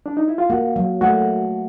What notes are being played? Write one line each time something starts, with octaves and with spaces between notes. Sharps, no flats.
D4
D#4
E4
F4
A#3 F#4
F#3
A3 F#4